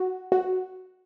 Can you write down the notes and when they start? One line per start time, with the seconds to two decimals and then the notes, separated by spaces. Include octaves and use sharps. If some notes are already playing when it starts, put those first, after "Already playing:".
Already playing: F#4
0.32 F#4